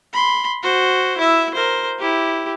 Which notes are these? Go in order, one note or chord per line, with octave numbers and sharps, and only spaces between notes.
B5 C6
F#4 C5
E4 E5
A#4 C5
E4 G4